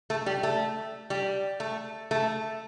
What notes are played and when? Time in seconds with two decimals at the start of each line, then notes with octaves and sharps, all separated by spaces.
0.10 A3
0.26 G3
0.43 A3
1.10 G3
1.60 A3
2.11 A3